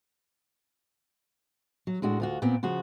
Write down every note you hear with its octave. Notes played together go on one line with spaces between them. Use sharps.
F#3
A2 G#3 D4 F#4
D2 F4 F#4
A#2 B3 C4
C#3 F3 F#4